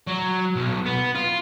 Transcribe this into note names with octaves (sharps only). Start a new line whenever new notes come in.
F#3
B1
B3
F4